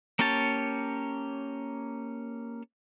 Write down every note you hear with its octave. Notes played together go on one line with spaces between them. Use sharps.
A#3 C#4 G4 C#5 A5